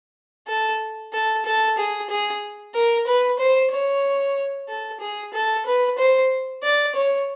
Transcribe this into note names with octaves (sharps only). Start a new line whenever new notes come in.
A4
A4
A4
G#4
G#4
A#4
B4
C5
C#5
A4
G#4
A4
B4
C5
D5
C#5